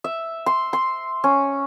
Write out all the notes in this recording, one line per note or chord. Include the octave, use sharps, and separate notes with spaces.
E5
C6
C6
C#4